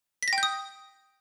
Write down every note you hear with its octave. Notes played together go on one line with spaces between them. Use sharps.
B6
A#6
G5
G6
D#6